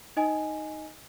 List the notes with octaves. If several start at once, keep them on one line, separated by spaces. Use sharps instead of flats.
D#4 D#5 G#5